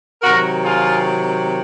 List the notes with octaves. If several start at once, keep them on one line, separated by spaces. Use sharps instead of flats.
C3 D#3 F#3 F#4 A#4
F4 G#4